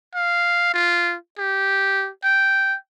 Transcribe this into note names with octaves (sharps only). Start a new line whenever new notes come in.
F5
F4
G4
G5